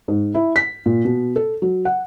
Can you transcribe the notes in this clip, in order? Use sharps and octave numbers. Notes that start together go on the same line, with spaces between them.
G#2
E4
B6
A#2
B2
A4
F#3
F#5